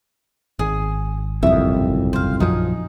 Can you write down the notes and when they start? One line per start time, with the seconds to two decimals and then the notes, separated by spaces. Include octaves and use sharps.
0.59 G#1 G#4
1.43 F#1 C2 F2 E5 D#6
2.13 C5 F5
2.40 A#1 F#2 F3 D#4 G#4